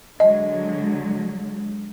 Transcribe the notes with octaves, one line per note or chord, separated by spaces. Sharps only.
D3 F#3 G#3 D#5